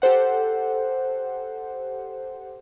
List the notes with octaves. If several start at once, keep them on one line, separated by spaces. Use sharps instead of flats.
G4 A4 C5 F#5